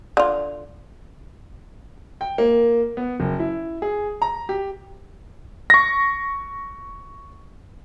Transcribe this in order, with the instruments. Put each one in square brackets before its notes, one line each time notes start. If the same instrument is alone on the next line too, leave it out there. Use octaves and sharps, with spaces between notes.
[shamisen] D3 F4
[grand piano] G5
A#3
B3
F#1
E4
G#4
A#5
G4
[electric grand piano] C#6 A#6